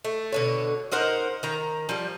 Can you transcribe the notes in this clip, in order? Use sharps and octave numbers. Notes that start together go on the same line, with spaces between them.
A3
B2 D3 C#5
D#4 A#4 C5 F#5
D#3 A#5
F3 G3